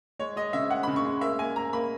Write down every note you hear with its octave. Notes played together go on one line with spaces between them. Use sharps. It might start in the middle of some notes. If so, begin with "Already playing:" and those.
G#3 C#5
G#3 D#5
C#3 E5
G#3 F#5
C#3 B5
C#6
G#3
A#3 E5
A#3 G#5
A#3 A#5
A#3 B5